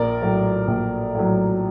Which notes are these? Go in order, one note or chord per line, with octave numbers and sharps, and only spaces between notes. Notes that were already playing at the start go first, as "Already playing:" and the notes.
Already playing: A#1 A#4 D5
A2 F#3
A#1
A2 F#3